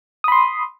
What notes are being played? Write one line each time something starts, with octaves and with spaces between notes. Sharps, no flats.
B5 C6 D#6